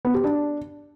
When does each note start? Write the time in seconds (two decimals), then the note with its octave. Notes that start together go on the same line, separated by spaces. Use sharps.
0.05 B3
0.14 G4
0.24 D4